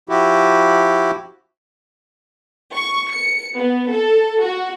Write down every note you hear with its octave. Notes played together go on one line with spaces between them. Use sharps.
F3 E4 F#4 G4
C#6
C#7
B3
A4
F#4